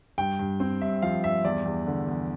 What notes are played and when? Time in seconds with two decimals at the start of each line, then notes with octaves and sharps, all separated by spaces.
0.18 G2 G5
0.39 G2
0.60 C4
0.81 G2 E5
1.02 F3 F5
1.24 G2 E5
1.45 E2 D5
1.65 E2
1.87 D3
2.08 E2